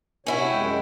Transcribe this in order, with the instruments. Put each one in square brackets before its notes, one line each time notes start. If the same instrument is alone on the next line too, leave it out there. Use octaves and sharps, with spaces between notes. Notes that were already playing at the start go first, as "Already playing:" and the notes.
[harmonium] C3 C#5 [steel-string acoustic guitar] C#4 E4 F#4
[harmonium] F#2 G#3 G5